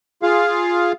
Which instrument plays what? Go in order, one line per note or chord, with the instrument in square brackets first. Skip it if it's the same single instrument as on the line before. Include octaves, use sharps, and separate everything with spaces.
[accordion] F4 G#4 F5